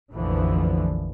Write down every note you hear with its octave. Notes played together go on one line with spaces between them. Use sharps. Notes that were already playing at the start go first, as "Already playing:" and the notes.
F1 A#1 D3 E3 F3